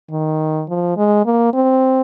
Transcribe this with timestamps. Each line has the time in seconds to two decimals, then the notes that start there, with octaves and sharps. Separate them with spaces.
0.11 D#3
0.69 F3
0.97 G#3
1.25 A#3
1.54 C4